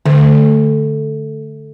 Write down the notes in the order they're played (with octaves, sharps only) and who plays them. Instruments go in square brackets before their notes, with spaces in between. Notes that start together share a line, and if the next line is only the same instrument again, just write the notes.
[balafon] D3 [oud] A3